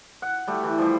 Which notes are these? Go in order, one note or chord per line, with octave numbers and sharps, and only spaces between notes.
F#5
G3 A3
E3
F3 G3